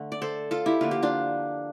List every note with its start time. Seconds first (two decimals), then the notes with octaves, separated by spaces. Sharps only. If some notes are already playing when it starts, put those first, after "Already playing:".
Already playing: D3 A3
0.12 D5
0.22 A4 C5
0.51 F4 A4
0.66 E4 G4
0.81 D3 F3 A#3 F4
0.91 G4
1.02 D4 F4